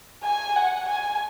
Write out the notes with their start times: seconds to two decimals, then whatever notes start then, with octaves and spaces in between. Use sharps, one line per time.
0.24 G#5
0.56 F#5
0.89 G#5